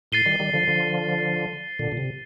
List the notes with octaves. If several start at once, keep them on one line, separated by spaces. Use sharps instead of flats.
A2 A6 C7 D#7 G7
D#3 G3
D#3 G3
D3 F3
D3 F3
A#2 D3
A#2
C3